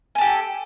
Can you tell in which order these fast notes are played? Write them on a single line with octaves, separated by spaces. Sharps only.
G#5 A4 G4